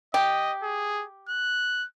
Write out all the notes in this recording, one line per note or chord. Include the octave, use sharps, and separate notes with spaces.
G4 D#5
G#4
F#6